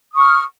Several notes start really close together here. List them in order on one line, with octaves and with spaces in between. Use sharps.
D#6 C#6 F6